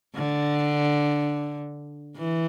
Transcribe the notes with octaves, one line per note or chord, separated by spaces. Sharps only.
D3
E3